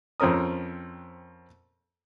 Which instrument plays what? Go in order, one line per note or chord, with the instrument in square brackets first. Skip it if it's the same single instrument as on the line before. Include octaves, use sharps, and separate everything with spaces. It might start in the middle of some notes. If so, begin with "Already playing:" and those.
[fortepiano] F2 C4 C#4 A#4 D#6